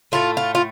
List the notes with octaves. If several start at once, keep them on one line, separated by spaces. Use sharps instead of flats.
A2 A3 F4
F4
F4